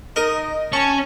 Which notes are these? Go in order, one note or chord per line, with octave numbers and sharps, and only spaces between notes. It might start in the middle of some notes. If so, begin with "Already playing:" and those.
D#4 A#4 D#5
C#4 A5 C#6